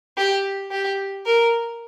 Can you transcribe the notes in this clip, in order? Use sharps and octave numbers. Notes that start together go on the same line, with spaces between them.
G4
G4
A#4